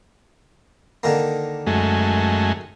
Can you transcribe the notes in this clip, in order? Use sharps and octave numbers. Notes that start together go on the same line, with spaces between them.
D3 D#3 A#3
F#2 G#3 A3